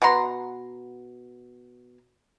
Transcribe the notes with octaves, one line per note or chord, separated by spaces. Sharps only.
B2 F#5 A#5 C6